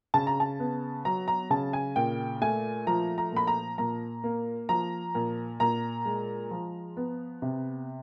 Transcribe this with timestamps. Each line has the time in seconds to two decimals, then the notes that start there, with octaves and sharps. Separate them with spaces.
0.14 C#3 A5
0.27 A#5
0.40 A5
0.59 B3
1.05 F#3 A#5
1.28 A#5
1.50 C#3 A5
1.73 G#5
1.96 A#2 G5
2.41 A3 G#5
2.87 F3 A#5
3.18 A#5
3.32 A#2 B5
3.47 A#5
3.78 A#2 A#5
4.24 A#3
4.69 F3 A#5
5.15 A#2
5.60 A#2 A#5
6.06 G#3
6.51 F3
6.97 B3
7.42 C3